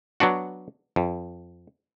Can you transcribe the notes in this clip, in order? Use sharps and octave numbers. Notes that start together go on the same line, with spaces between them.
F#3 B3 D4 F#4
F2